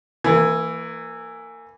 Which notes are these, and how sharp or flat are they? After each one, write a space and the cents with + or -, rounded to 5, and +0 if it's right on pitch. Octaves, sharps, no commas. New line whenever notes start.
E3 +5 A#3 -30